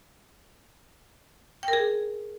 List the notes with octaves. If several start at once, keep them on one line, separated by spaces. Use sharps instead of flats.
G5
A#4
G#4